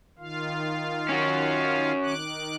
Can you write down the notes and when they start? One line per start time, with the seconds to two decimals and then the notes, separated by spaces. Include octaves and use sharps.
0.19 D#3 F4 F5
1.09 C#4 F#4
2.03 D#3 D6 F#6